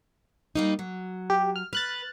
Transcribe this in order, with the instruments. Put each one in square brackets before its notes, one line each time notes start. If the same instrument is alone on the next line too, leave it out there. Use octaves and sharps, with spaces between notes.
[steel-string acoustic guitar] G3 A#3 D#4
F#3
[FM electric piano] G4
F6
[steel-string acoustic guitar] B4 [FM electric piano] F6 F#6 A6